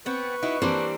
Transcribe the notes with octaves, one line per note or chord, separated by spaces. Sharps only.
B3 C4 B4 C#6
D#4 E4 F#4
E3 G3 A#3 C4 D4 C5